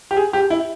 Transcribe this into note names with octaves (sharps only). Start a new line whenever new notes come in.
G4
G#4
G4
E4